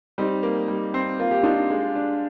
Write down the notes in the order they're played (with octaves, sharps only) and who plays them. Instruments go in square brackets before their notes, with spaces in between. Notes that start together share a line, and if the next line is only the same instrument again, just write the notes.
[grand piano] G3 [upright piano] C4 D#4
[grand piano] A#3
G3
C4
[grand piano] A#3 [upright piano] F4
[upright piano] G4
[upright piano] D4 F4 [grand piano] D#4
[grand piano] G#3
D4